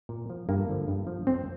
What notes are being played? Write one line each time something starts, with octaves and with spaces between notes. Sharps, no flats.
A#2
F3
G2 A#3
D3 F3
G2
F3
F2 C4